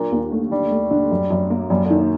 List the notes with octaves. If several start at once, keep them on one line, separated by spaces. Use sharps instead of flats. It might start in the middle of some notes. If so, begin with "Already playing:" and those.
Already playing: A#2 F#3 D4
D#2
A3
D3 G3
A3
D3
F#2
F#2
A#3
F#2 G3
D3
D#3